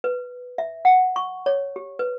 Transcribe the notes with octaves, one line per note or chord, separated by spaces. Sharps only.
B4
E5
F#5
C#6
C#5
G4
B4